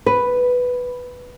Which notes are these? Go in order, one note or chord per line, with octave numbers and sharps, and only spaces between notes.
B4